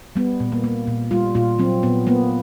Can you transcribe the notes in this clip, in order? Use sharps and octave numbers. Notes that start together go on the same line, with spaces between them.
G3 B3
A#2
A#3
A#3
A#2
G3 F4
A#2 F4
F#3 C4
A#2 B3
A#3 B3